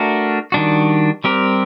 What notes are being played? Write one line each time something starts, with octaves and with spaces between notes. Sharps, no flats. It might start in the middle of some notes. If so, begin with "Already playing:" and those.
Already playing: A3 D4 F#4 A#4
D#3 G3 D4 F#4
G3 C4 G4 A#4